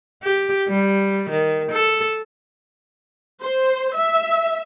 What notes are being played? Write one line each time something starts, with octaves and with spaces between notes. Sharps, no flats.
G4
G3
D#3
A4
C5
E5